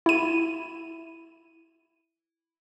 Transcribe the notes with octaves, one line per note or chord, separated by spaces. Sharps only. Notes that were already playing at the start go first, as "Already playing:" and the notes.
E4 D#7